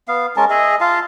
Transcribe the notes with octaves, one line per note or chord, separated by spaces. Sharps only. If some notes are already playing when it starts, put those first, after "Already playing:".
B3 F5
G#3 C#4 A#4 A5
G#4 D#5 E5
F4 F5 A5